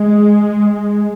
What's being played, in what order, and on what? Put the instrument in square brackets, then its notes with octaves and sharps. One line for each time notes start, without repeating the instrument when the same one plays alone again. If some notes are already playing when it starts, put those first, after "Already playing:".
Already playing: [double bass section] G#3